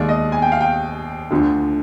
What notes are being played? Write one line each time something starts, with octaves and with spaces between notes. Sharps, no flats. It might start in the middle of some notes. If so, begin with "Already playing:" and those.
Already playing: D#2 D#3 G#3 D5
D#5
G#5
G5
F5
G5
D2 D3 F3